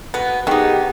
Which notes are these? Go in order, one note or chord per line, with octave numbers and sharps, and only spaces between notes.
B2 B3
D#3 B3 D#4 G4 G#4